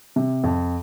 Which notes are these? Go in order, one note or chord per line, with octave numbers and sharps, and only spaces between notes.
C3
F2